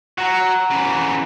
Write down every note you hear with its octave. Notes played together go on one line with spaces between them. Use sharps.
F#3 F#5 A#5
C#3 E3